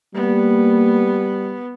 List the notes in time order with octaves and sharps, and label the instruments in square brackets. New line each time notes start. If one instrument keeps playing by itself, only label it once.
[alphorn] G3 [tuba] A#3 [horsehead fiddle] B3